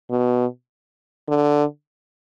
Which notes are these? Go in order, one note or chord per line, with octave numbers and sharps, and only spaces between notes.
B2
D3